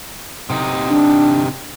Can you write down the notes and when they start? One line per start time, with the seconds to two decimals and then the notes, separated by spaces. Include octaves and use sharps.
0.50 C3 D#4
0.89 D4